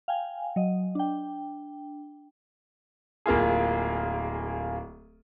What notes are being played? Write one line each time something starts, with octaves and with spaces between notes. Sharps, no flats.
F5 G5 G#5
F#3 D#5
D4 G5
D1 A#3 F4 G#4